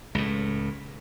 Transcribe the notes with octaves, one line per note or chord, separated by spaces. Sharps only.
C#2 A2